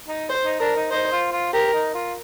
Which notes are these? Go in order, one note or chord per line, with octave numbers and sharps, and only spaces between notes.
D#4
C5
D#4
D4 A#4
D#4
D#4 C5
F4
F4
G4 A#4
D#4
F4